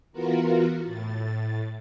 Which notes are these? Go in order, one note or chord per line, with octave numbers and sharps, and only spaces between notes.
E3 B3 F4 F#4 A#4
A2 A6